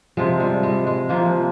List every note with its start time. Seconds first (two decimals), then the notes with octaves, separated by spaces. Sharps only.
0.17 C3 F3 G#3
0.40 G3
0.63 G#3
0.87 G#3
1.09 C3 F3 A#3